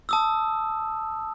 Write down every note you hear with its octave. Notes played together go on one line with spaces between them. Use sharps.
A5 D#6 E6